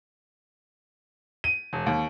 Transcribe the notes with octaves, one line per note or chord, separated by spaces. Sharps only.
D#7
E1
D#2